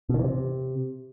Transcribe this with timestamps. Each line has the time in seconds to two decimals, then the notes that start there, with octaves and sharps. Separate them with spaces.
0.09 B2
0.14 D#3
0.19 E3
0.24 C3